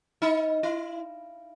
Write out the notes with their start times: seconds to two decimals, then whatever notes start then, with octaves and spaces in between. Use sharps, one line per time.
0.22 D#4
0.63 E4